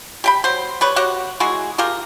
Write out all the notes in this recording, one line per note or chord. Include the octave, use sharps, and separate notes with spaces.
G4 G5 B5
F#3 C5
G3 B4 C#5
F#4 G4 C#5 F#5
G#3 E4 F#4 G#4
F4 G4 G#4 A#4